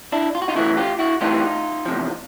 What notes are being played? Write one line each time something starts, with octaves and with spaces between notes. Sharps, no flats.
D4 E4
F4
F#4
D#4 F4
C#3 E3 A3 E4 F#4
F4 G4
E4 F#4
A2 E3 G3 C4 D#4 F4
E2 C3 F3